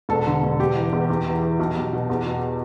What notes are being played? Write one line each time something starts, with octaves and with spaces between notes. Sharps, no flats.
E1 A4
D3
E1
E1 G4
E3
E2
E2
E3
E3
B1
B1
B2
E2
B2